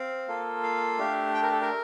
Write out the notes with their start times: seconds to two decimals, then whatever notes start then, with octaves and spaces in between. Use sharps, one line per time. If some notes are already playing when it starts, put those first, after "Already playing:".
Already playing: C4 F5
0.28 A#3 F4 A4
0.63 F5
0.99 A3 D4 G4
1.34 G5
1.42 A#4
1.52 A4
1.61 A#4